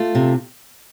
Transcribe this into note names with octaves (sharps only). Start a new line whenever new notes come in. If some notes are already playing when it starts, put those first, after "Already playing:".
Already playing: A3 F4
C3